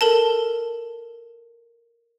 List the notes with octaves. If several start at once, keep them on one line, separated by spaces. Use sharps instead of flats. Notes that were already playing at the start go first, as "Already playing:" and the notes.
A4 A#4 A5